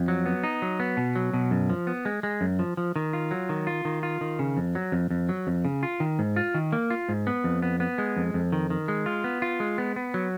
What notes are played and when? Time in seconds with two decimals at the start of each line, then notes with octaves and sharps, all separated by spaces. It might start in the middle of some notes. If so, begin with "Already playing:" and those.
Already playing: F2
0.08 F#3
0.26 B3
0.44 D#4
0.62 F#3
0.80 B3
0.97 B2
1.16 F#3
1.34 B2
1.51 F#2
1.70 F3
1.87 B3
2.05 G#3
2.23 G#3
2.41 F#2
2.59 F3
2.77 F3
2.96 D#3
3.13 F4
3.31 F#3
3.49 D#3
3.67 F4
3.85 D#3
4.03 F4
4.21 D#3
4.39 C#3
4.57 F2
4.75 F#3
4.92 F2
5.10 F2
5.29 F#3
5.47 F2
5.65 C#3
5.83 F4
6.00 D#3
6.19 G#2
6.36 F4
6.54 D#3
6.73 A#3
6.90 F4
7.09 G#2
7.27 B3
7.44 F2
7.62 B3
7.80 B3
7.98 G#3
8.16 F2
8.34 F2
8.53 D#3
8.70 D#3
8.88 G#3
9.06 F4
9.24 B3
9.42 F4
9.60 G#3
9.78 B3
9.96 B3
10.14 F#3